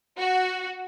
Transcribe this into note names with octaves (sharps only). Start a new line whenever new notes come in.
F#4